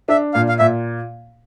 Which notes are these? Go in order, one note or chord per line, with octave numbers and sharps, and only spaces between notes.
D4 E5
A#2 F5
F5
A#2 E5